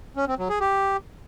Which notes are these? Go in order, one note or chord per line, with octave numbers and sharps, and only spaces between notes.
C#4
C4
F#3
G#4
G4